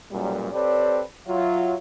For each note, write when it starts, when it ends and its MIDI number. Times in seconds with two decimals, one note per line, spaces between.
0.11 0.49 35
0.11 0.49 42
0.11 0.49 46
0.11 0.49 55
0.53 1.01 60
0.53 1.01 67
0.53 1.01 69
0.53 1.01 71
0.53 1.01 73
0.53 1.01 74
1.27 1.75 54
1.27 1.75 65
1.27 1.75 76